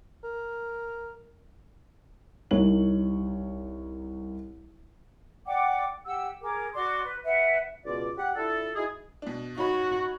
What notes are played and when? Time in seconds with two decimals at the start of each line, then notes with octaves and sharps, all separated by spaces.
0.24 A#4
2.51 C2 D#4 C#5 F#7
5.46 D5 F#5 G5 D6
6.06 G4 F#5 E6
6.41 G#4 A#4 D6
6.74 F#4 D5 C6 D6
7.04 B4
7.24 B4 E5 F#5
7.85 C#2 B2 F4 D5
8.17 G4 F#5
8.36 D4 E4 F4 A4
8.75 D#4 E4 F#4 G#4
9.22 B2 D4
9.58 D#4 F#4 C#5 B5